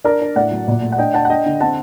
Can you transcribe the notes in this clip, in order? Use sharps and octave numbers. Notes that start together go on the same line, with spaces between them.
D4 A#4 D5
D4
A2 D5 F#5
F#3
A#2
A3
F#5
D4 D#5 G5
D4 F#5 A5
F#5
D4 D#5 G5
D3
C4 F#5 A5